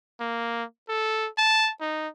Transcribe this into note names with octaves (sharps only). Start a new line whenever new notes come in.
A#3
A4
A5
D#4